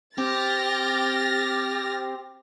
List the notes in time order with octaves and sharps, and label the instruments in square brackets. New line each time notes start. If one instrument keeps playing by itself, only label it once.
[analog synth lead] C4 [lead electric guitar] G4 [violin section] F6 A6 A#6